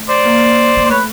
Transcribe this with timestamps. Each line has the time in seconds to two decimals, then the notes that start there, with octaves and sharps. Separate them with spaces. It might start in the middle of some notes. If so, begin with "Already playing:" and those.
Already playing: A3
0.09 C5 D5
0.25 A#3
0.77 A#3
0.85 C5
0.89 A3 B4 C#5